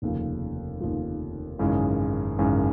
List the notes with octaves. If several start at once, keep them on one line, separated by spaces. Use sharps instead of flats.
F1 D#2 C#3 F3
F1 D#2 C#3 F3
G#1 F#2 C#3 E3 G#3
G#1 F#2 C#3 E3 G#3